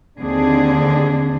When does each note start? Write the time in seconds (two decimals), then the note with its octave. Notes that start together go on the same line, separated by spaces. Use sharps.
0.19 D#2 D3 C4 D4 G#4